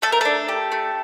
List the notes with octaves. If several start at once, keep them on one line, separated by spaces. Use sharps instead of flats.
A3 A4
A#4
D4 A4
G4
A3